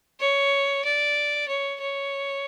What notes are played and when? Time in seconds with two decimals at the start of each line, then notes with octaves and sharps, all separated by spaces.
0.20 C#5
0.84 D5
1.48 C#5
1.80 C#5